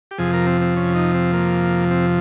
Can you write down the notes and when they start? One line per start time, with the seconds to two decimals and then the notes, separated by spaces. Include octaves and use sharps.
0.11 G4
0.18 F2 C3 F3 G#4
0.33 A#4
0.47 C4
0.61 C4
0.76 C#4
0.95 D#4
1.14 C4
1.33 A#3
1.91 C4